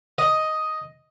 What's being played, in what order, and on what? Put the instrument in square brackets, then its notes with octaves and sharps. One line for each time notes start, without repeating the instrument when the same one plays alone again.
[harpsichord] D#5